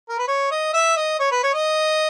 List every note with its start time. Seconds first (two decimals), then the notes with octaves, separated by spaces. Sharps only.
0.09 A#4
0.18 B4
0.28 C#5
0.51 D#5
0.74 E5
0.97 D#5
1.19 C#5
1.31 B4
1.43 C#5
1.54 D#5